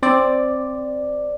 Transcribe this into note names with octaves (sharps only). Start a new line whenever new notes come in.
C4 D5